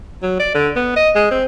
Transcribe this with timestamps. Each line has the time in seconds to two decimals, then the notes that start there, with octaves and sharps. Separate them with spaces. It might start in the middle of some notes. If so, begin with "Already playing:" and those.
0.22 F#3
0.39 D5
0.55 D3
0.76 B3
0.97 D#5
1.15 G#3
1.31 C4